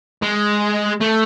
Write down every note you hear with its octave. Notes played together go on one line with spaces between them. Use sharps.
G#3
A3